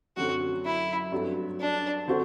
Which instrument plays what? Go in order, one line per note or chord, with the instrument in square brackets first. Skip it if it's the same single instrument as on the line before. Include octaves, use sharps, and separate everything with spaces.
[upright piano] F#2 D3 F#3 A3 C4 [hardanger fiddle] F#4
[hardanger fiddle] E4
[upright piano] G2 F#3 A3 C4
[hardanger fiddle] D4
[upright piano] D3 A3 C4 F#4 C5